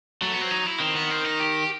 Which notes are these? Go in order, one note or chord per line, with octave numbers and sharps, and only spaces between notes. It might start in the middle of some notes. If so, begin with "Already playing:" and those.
F#3 A3
B3
C4
D#4
E4
D#3 C4
B3
C4
D#4
G4